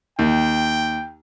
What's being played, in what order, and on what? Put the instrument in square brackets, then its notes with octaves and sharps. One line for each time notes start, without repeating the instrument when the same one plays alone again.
[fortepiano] D#2 [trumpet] G5